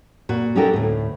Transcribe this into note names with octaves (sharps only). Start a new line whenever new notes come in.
A#2 F#4
C#4 D#4 F#4 G4 A4 A#4
D2 A2